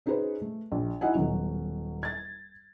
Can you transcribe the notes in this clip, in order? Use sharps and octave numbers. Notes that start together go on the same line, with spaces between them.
C#4 D#4 F#4 G#4 B4 C5
A3
A#1
D#4 E4 F#4 D#5 F#5 G#5
D#1 B2 F#3
G#6 A6